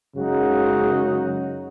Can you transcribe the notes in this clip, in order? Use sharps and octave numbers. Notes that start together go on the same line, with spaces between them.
F#2 C#3 G#3 D#4 F#4